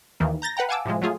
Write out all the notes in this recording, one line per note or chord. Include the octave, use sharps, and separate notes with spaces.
D#2 D#3 E3 A#3
A#5 G6 A6 A#6
B4 F#5 G5 A#5
F5 F#5 G#5 A5 D6 E6
A2 C3 F3 G#3
F#3 A3 F4 G#4